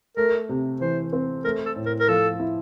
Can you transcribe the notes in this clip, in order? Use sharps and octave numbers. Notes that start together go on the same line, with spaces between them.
A3 A#4
C3
E3 C5
C4
A3 A#4
A4
A2
A#4
A#4
F3 A4
E4